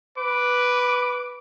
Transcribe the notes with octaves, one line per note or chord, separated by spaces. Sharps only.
B4 D6